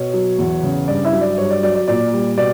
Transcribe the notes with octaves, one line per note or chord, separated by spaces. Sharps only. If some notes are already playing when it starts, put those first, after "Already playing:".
Already playing: B2 C#5
F#3
E2
C#3
G2 D5
E4 E5
F#3
D5
G2 C#5
D5
F#3 D5
D5
A#2 D5
G3
B2 D5